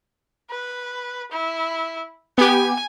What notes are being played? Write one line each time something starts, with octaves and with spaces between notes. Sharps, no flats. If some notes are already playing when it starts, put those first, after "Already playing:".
B4
E4
B3 G4 G#5